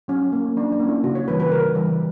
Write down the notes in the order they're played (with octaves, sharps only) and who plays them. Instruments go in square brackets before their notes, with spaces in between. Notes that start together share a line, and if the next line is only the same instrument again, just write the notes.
[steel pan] F#3 C#4
A#3 C#4
F#3 D4
D4
A#3 C#4
E4
C#3 F#4
C#5
E3 G3 B4
B4
C#3 A#4
E3 G3